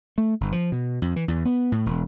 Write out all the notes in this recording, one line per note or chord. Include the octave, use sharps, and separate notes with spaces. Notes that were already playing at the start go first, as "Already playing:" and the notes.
A3
G1
F3
B2
F2
E3
E2
B3
A2
E1